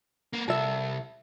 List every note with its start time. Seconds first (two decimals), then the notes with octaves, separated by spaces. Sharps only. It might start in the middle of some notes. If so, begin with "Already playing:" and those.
0.33 A#3 B3
0.48 C2 A4 E5